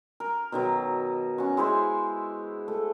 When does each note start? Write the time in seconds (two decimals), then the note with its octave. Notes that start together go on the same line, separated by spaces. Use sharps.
0.20 A#4
0.52 B2 D#3 F#3
1.38 C#4 F#4
1.57 G#3 E4 C5 G#5
2.68 A3